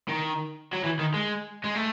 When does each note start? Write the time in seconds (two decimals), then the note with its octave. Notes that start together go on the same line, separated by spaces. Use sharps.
0.08 D#3
0.73 F#3
0.84 E3
1.00 D#3
1.14 G#3
1.64 G#3
1.75 A3